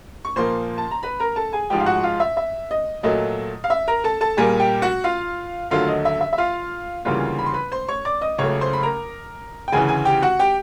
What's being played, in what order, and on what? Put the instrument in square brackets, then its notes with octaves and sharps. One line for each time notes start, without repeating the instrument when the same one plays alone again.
[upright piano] C#6
A#2 F3 A#3 C5 C6
A5
A#5
B4 B5
A#4 A#5
A4 A5
G#4 G#5
G#2 F3 G#3 G4 G5
F5
F#4 F#5
F4 F5
E5
E5
D#5
A#2 F#3 A3 D#5
F5
E5
A#4 A#5
A4 A5
A4 A5
A#2 G3 A#3 G#4 G#5
G4 G5
F#4 F#5
F4 F5
D#2 D3 F#3 A3 F4 F5
D#5
E5
E5
E5
F4 F5
D2 C#3 E3 G3 A#3 F4 F5
B5
C6
B4 B5
C5 C6
C#5 C#6
D5 D6
D#5 D#6
C#2 C#3 F#3 A3 C#5 C#6
C5 C6
B5
A#4 A#5
G5
D2 C#3 E3 G#4 G#5
G#4 G#5
G4 G5
F#4 F#5
G4 G5